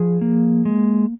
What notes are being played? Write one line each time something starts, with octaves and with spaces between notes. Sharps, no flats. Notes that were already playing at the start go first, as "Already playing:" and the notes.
Already playing: F3 G#4
A#3
G#3